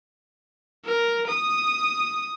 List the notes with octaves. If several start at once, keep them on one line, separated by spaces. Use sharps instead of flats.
A#4
D#6